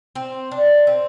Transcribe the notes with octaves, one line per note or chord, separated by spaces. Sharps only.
C4
D4
C4